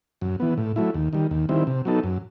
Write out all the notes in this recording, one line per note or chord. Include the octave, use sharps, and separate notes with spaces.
F#2
E3 B3
A2
F#3 A3 E4
D#2
D#3 G3
D#2
D#3 G3 C4 E4
C3
F#3 B3 D#4 A4
F#2